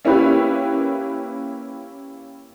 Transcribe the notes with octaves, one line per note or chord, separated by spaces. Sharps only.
A#3 C#4 E4 G4 B4